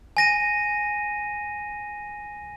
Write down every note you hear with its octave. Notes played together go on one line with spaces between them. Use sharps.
G#5 A#6 D#7